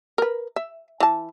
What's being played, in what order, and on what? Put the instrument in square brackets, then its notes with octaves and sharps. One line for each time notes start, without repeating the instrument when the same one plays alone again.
[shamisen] A#4 B4
E5
E3 A5